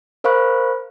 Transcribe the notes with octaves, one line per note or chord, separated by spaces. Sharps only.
A#4 C5 F5 B5 C#6 F#6